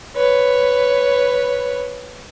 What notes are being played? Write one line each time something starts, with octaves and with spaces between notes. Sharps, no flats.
B4 C#5